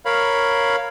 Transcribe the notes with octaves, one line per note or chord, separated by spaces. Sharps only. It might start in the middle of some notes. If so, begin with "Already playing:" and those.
A#4 C#5 F5 B5